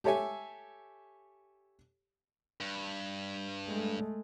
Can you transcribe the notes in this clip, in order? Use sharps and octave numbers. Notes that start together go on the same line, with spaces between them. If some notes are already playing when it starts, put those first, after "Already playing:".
G4 A4 C#5 E5 G#5
G2
G#3 A3